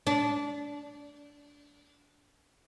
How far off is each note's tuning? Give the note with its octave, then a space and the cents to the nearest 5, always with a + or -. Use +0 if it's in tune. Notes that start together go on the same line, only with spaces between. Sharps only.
D4 -20